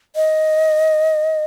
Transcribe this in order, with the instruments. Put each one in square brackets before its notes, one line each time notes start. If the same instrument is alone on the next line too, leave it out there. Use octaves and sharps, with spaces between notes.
[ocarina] D#5